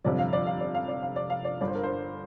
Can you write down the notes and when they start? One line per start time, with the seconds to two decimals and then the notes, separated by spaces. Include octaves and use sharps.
0.04 G1 F2 C3 F3 D5
0.19 F5
0.33 D5
0.47 F5
0.60 D5
0.75 F5
0.88 D5
1.03 F5
1.16 D5
1.30 F5
1.45 D5
1.60 G1 G2 D3 D5
1.67 C5
1.75 A#4
1.83 C5